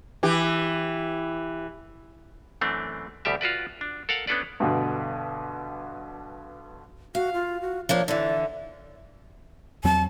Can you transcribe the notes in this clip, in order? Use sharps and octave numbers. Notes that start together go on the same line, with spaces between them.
E3 G4
F#2 E3 A3 C4 D4
D2 B2 G3 G4 E5
F4 F#4 B4 D5
D4
A4 A#4 F5 F#5
B3 C#4 D4 A4 B4 D5
G2 B2 D3
F#4 F5
F4
F#4
F3 A#3 D4 C#5
D3 E3 D5
E2 F#3 C4 A5